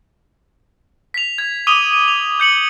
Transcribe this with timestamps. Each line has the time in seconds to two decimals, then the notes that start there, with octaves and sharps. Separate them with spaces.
1.14 B6 F7
1.38 G#6
1.67 D6 D#6 D#7 F7 G7
1.93 D#7
2.08 F7
2.40 G6 C#7 F#7